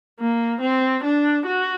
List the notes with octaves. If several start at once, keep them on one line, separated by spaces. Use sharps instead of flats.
A#3
C4
D4
F#4